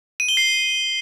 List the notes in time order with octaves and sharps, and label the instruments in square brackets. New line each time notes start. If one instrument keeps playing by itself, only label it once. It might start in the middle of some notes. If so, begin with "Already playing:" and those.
[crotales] D#7
G7
C7